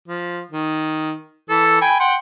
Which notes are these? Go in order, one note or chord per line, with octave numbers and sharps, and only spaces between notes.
F3
D#3
E3 A4
G5 G#5 B5
F#5 G5 C6